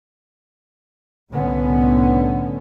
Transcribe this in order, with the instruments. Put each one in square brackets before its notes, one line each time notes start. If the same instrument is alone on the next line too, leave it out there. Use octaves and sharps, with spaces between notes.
[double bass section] C2 A2 D3 B3 C#4